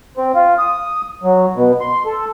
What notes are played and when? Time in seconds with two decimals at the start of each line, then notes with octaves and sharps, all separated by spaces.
0.17 C4
0.35 F4
0.58 D#6
1.23 F#3
1.56 B2
1.81 C6
2.06 A4